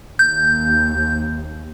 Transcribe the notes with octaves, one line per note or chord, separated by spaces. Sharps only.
D#2 G6